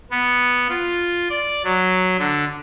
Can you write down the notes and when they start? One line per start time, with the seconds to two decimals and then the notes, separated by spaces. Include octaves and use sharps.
0.11 B3
0.69 F4
1.30 D5
1.64 F#3
2.19 D3